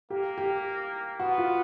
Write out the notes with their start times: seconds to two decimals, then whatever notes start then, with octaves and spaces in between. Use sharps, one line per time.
0.10 A#3 G4
0.38 G4
1.19 B3 F#4
1.38 F4